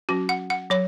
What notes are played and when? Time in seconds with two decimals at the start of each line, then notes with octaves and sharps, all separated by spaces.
0.09 F#3 C#4 F#4
0.29 F#5
0.50 F#5
0.70 F#3 C#5